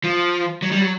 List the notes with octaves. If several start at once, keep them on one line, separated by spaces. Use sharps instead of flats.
F3
F#3
G3
F#3